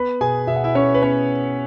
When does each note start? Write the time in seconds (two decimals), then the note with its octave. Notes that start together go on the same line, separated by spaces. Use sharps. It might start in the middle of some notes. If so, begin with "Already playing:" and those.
Already playing: B3 B4 B5
0.21 B2 G#4 G#5
0.47 B2 E5
0.56 F#5
0.64 E4 E5
0.75 C#4 E4 C#5
0.94 B4
1.03 B3 C#4 C#5